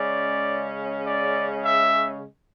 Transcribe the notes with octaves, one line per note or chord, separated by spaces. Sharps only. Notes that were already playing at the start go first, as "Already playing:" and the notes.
Already playing: C#3 G#3 C#4 D5
D5
E5